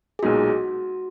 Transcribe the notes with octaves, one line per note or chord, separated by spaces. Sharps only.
G#4
B1 A#2 G#3 D#4 F#4